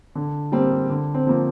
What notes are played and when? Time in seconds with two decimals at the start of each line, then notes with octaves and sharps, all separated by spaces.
0.15 D3
0.52 G3 A#3 C4
0.90 D3
1.14 C4
1.27 F3 A#3